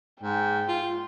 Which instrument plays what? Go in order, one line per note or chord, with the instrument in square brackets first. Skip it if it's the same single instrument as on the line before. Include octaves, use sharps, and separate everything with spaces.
[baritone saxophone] G#2 [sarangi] G5
[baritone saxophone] F4